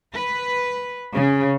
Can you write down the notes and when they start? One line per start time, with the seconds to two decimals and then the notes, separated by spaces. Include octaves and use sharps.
0.13 B4
1.16 C#3